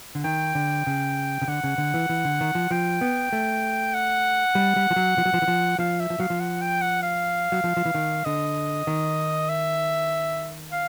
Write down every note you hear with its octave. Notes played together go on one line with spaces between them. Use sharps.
D3
D#3 G5
D3
C#3
C#3
D3 F#5
C#3
D3
E3
E3
D3
D#3
F3
F3 G5
B3
A3
F#5
G3
G3
F3
F#3
F3
F#3
F3
E3
F3
F3 F5
E5
F3
F#3 F5
F3
F#5
G5
F#5
F5
F#3
F3
F3
E3
D#3
D3 D#5
D#3
E5
F5